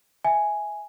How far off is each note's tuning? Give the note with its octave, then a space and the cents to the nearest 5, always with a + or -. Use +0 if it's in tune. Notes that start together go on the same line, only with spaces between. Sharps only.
E5 -5 G#5 +0